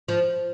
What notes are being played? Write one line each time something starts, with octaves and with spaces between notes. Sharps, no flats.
F3